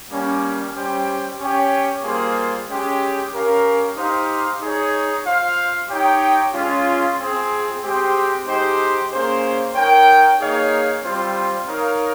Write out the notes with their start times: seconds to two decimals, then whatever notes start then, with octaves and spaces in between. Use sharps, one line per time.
0.11 G3 A#3 C#4
0.75 G3 C#4 G4 C5 G5
1.40 C#4 G4 C#5 G5
2.03 G3 A#3 F4 G#4 C5
2.68 G#3 C#4 G4
3.33 C#4 G4 A#4 F5
3.96 D#4 G4 C5 F5
4.61 D#4 G#4 C#5
5.24 F4 C5 F5
5.89 D#4 G4 C#5 G5
6.53 G#3 C#4 F4
7.18 C4 F4 G#4
7.81 G#3 C4 G4 C5 G5
8.46 G#3 D#4 G4 C5
9.11 A#3 C#4 G#4 C5
9.74 D#4 A#4 C#5 G5
10.39 A#3 D#4 G#4 C#5 F5
11.03 G3 C4 F4 C5
11.67 D#4 A#4 C#5 F5